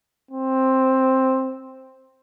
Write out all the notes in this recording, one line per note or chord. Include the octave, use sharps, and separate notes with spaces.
C4